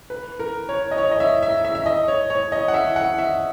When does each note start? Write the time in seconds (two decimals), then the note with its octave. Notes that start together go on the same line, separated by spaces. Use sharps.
0.10 B4
0.40 A#4
0.69 C#5
0.91 D#5
0.98 C#5
1.11 D#5
1.20 E5
1.43 E5
1.65 E5
1.75 E5
1.86 D#5
2.08 C#5
2.30 C#5
2.52 D#5
2.68 F#5
2.74 E5
2.96 F#5
3.19 E5